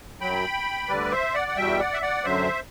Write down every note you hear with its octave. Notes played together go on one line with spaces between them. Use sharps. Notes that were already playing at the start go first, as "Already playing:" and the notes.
F#2 F#3 G5 B5
D2 D3 G3 B4 D5
C5 E5
D5 F#5
F#5
E2 B2 G3 E5 G5
D5 F#5
E5
D5 F#5
F#2 D3 F#3 C5 E5